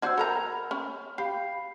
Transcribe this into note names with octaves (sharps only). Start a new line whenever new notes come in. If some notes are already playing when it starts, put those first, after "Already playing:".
D4 F#4 C5 E6 G6 G#6
A4 A#4 A#5 B5 F7
C#4
G4 F5 B5 C7